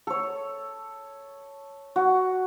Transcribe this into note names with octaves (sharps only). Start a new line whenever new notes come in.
A4 C#5
F#4